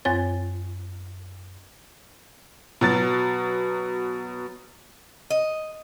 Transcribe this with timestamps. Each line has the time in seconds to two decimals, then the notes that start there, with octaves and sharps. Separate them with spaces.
0.05 F#2 C4 F4 C#5 G#5 A6
2.81 B2 F#3 A6
5.30 D#5